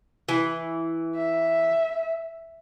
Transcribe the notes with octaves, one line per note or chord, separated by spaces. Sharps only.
E3
E5